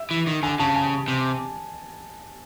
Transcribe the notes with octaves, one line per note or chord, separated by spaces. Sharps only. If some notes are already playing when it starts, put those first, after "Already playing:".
Already playing: E5
E3
D#3
D3 G#5
C#3 A5
G#5
C3